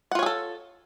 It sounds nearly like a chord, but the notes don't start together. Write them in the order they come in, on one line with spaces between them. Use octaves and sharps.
F#5 F4 C#5 G#4 A4